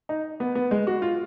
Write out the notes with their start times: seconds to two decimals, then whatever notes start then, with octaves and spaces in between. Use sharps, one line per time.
0.09 D#4
0.40 B3
0.55 B3
0.71 G#3
0.87 F#4
1.02 F4